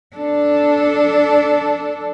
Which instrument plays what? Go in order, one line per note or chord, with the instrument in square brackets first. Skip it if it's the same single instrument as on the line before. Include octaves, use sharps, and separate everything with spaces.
[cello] D4 A4